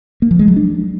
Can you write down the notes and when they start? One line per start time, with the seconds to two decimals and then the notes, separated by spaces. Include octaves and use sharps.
0.22 A#3
0.31 F3
0.39 G#3
0.48 F#3
0.56 D4